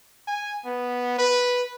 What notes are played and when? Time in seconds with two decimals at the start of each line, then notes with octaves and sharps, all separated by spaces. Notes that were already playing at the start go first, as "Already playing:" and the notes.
0.28 G#5
0.65 B3
1.19 B4